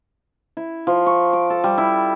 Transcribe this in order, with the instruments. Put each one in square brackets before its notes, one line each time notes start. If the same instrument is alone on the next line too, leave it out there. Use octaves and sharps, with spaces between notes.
[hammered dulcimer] E4
F3
C#6
D6
A4
G3
E4